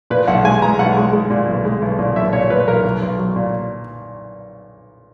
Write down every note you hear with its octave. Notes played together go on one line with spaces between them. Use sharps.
A#2 B4
B1 F#5
G#3 G#5
G#3 A#5
B1 F#5
G#3
G#3
A#2
B1
G#3
B1
A#2
B1 E5
A#2 C#5
A#2 B4
B1 A#4
B1
B1
F#3
A#2